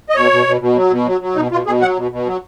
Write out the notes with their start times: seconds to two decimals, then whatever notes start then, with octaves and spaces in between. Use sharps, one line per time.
0.09 D#5
0.16 B2 C#5
0.31 B2
0.46 B2
0.61 B2
0.76 F#3
0.91 B2
1.07 F#3
1.21 F#3
1.36 B2 D#4
1.52 B2 F4
1.66 B2 G#4
1.81 F#3 F#5
1.96 B2
2.11 B2
2.27 F#3